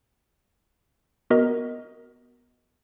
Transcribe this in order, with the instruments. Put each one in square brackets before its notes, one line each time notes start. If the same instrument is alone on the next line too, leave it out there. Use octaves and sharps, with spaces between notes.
[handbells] B3 F#4 A#4 D#5